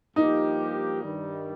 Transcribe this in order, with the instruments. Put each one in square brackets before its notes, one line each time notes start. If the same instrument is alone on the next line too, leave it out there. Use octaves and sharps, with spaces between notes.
[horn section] G2 F3 A#3 G4 [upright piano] D#4
[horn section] G2 D#3 G3